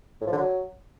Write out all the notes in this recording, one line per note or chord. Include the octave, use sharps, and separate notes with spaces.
A2
F3
D3
F#3